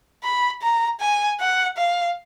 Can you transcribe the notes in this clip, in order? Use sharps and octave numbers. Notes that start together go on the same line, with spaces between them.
B5
A#5
G#5
F#5
F5